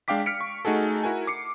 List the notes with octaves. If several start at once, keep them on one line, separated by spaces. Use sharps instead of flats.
G#3 D4 F5 G5 D6 B6
F6 B6 C#7 D7
C#6
A3 D#4 F#4 G#4 A4
E4 F#4 A#4 G#5
D6 C7 C#7